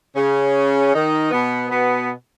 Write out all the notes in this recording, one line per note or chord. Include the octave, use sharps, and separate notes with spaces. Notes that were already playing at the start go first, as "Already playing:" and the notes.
C#3 C#4
D#3 D#4
B2 B3
B2 B3